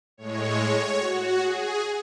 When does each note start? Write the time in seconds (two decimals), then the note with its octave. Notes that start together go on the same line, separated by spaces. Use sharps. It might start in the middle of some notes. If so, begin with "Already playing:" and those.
0.17 A2 G#3 C#5
0.99 F#4
1.38 G#4